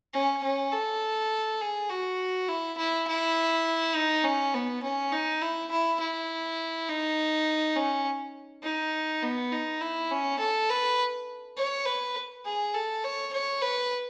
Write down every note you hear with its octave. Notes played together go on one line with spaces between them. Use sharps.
C#4
C#4
A4
G#4
F#4
E4
E4
E4
D#4
C#4
B3
C#4
D#4
E4
E4
E4
D#4
C#4
D#4
B3
D#4
E4
C#4
A4
B4
C#5
B4
G#4
A4
C#5
C#5
B4